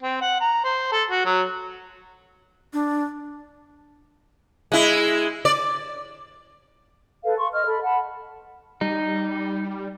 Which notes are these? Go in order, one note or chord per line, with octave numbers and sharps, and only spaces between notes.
C4
F#5
A#5
C5
A4
F#4
F#3
D4
G#3 E4
D5
A4 B4 F5
C6 C#6
D#5 F6
A4 B5
F#5 A5 B5
G3 D#4